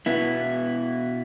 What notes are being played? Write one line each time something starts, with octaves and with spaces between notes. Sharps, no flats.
B2 B3 E4